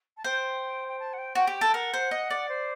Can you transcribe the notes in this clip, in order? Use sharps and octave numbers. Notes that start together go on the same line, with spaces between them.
A5
C5 G5
G5
A5
F#5
G5
F#4 G5
G4
G5
A4
A#4 F#5
C5
D#5
D5
C5